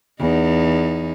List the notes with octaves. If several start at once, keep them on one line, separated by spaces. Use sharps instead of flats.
E2 D#4